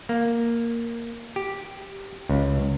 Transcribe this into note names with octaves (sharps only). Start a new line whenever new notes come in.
A#3
G4
C#2